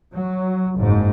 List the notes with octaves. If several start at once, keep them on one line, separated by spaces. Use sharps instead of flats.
F#3
F#1 G#2